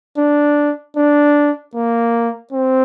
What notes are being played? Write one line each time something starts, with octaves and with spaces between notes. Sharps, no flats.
D4
D4
A#3
C4